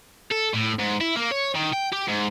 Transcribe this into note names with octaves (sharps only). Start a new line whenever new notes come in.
A4
A2
G#2
E4
A#3
C#5
D#3
G5
G4
G#2